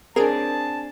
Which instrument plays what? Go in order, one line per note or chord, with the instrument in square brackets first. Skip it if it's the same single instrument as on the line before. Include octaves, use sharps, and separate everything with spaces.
[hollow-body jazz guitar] C4 D4 [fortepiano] G#4 [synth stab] A#4 [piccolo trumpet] A5